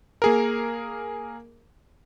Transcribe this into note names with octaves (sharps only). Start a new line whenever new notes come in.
A#3 G#4 A#4